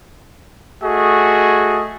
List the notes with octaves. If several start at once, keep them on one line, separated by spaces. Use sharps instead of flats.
A3 F#4 G#4 D#5